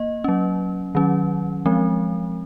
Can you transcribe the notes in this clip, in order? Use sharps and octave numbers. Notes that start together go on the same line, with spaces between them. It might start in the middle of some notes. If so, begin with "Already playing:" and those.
Already playing: A#3 D#5
F#3 C#4
D#3 F#3 C#4
F3 G#3 C4